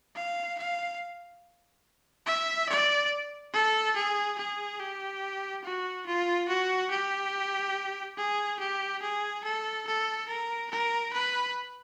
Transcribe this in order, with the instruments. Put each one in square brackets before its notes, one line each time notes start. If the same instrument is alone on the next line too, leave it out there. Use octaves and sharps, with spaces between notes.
[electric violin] F5
F5
E5
D5
A4
G#4
G#4
G4
F#4
F4
F#4
G4
G#4
G4
G#4
A4
A4
A#4
A#4
B4